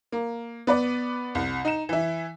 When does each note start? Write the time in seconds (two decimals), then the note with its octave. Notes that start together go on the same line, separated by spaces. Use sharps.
0.12 A#3
0.67 B3 B4 D5
1.35 C2
1.65 D#4 E7
1.89 E3 E4